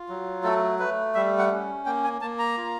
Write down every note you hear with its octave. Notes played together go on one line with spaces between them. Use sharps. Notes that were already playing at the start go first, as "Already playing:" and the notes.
Already playing: F4
F#3
A3 A4
A3 B4
G3 E5
F#5
C#4
A#3 G5
G#5
A#3 A5
A#5
F4